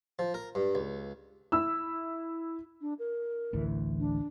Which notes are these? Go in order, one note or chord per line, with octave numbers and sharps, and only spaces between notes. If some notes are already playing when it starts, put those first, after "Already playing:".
F3
A#4
G2
C#2
E4 E6
D4
A#4
A1 D2 E3
D4